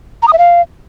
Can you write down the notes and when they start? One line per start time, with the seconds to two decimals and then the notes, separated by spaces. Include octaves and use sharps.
0.22 A#5
0.28 D#6
0.33 E5
0.38 F5